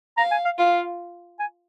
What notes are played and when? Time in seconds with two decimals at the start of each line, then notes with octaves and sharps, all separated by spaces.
0.17 F5 A#5
0.31 G#5
0.45 F5
0.58 F4 F5
1.39 G#5